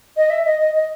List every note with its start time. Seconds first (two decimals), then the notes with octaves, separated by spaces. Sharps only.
0.17 D#5
0.30 E5
0.45 D#5
0.59 D#5
0.74 D#5